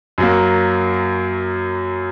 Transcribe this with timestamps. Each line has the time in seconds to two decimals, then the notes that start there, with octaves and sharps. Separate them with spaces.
0.18 F#2 F#3 A#3